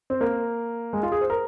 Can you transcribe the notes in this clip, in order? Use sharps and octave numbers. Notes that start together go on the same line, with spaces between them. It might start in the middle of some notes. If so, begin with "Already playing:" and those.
C4
A#3
G#3
F4
G#4
C5
A#4